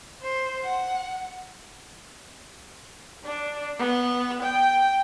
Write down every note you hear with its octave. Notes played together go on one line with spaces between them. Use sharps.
C5
F#5
D4
B3
G5